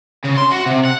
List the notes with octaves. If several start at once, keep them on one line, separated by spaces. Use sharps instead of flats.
C#3
C6
F#4
C3
F#5